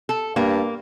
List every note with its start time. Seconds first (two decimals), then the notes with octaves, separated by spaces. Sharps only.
0.09 A4
0.36 G2 A#3